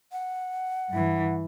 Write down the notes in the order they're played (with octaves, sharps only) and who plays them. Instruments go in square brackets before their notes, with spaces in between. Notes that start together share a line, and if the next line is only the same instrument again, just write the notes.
[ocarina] F#5
[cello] G2 E3